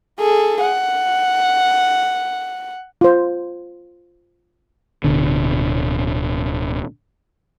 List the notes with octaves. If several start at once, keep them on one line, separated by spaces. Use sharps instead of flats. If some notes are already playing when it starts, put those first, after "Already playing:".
G#4 A4
F#5
F4 C5
D1 B2 D3